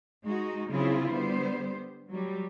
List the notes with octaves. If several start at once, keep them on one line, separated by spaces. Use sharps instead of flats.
G#3 D#4 F#4
C#3 F#3 C4 E4 F4 G#4
D3 G3 B3 C5
F#3 G3